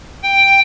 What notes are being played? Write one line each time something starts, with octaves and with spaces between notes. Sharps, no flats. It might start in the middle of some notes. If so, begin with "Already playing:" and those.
G5